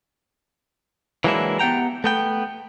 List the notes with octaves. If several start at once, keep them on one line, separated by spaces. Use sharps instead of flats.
E3 F#3 G#3 A#3 D4 E4
B3 G4 F#5 G5 A#5
A3 B3 G5